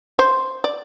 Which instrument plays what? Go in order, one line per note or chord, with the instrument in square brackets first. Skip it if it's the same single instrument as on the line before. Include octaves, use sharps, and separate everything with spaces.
[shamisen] C5
D5